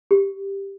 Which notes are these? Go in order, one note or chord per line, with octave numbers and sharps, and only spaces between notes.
G4